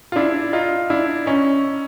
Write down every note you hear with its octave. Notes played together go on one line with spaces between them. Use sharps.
F4
D4 E4
D#4 F4
D4 E4
C#4 D#4